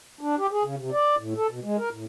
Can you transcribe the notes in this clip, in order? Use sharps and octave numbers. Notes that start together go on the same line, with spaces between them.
D4
G4
G#4
C#3
C3
D5
A2
A4
B2
G#3
A#4
A2